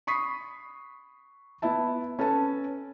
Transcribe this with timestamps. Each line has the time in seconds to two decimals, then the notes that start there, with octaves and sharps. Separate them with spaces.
0.07 B5 C#6 D#6 B6 C7
1.62 B3 E4 E5 A5
2.19 C#4 A4 B4 A5